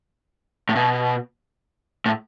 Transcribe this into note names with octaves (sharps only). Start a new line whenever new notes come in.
A2
B2
A2